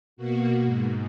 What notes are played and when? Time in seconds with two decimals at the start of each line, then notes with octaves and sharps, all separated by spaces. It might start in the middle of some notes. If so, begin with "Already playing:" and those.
0.16 B2 A#3 F#4
0.65 G#2